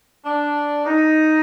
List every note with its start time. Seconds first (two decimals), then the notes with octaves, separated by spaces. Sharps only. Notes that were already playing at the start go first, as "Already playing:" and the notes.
0.24 D4
0.85 D#4